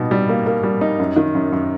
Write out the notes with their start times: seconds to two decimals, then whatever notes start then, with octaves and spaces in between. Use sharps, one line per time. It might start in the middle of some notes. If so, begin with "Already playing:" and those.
Already playing: B2 G3 D#4
0.11 G3
0.29 A#3
0.46 A#3
0.63 G3
0.81 D#4
0.99 F#2
1.16 D#3
1.35 F#2
1.52 F#2